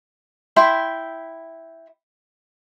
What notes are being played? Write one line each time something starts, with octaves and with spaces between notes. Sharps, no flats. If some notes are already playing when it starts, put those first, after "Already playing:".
E4 E5 G5 C6